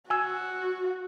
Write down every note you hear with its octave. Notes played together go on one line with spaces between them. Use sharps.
F#4 G#5 E6